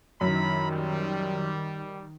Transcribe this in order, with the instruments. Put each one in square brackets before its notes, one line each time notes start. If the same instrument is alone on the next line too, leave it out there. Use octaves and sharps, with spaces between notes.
[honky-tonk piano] F#2 [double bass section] D#3 [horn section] E4 A#5 B5
[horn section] G3